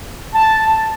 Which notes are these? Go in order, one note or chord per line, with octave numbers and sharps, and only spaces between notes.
A5